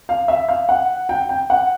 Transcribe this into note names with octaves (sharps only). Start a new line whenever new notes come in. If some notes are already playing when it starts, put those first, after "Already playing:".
F5
E5
F5
F#5
G5
G5
F#5